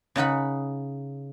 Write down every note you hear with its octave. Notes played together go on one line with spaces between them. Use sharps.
C#3 D#4 F#5 B5